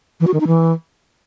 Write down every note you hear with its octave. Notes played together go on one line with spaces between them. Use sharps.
E3
F#4
D#3
D#4
E3